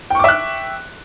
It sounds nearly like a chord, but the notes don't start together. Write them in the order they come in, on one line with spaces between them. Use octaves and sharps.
G5 C#6 D6 E5 F#6